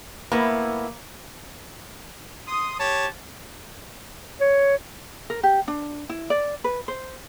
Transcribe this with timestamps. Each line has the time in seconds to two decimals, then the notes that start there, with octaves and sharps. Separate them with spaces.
0.32 A2 A#3 B3 E4
2.48 C6 D#6
2.79 G4 C#5 A5
4.41 C#5
5.30 A#4
5.43 G4
5.68 D4
6.09 E4
6.30 D5
6.64 B4
6.88 C5